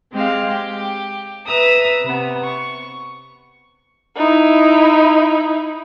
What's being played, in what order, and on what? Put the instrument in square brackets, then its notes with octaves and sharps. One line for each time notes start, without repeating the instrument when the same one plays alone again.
[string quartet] G#3 C4 G4 F5
G4
B4 E5 A#5 D#6 E6
C3 B3
C#6
[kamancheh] D#4 E4